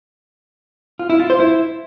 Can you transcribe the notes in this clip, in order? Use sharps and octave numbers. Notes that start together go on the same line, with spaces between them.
F4
E4
F4
C5
E4